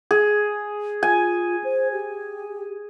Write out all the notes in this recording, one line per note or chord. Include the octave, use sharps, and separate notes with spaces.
G#4
F4 G#5
C5
G4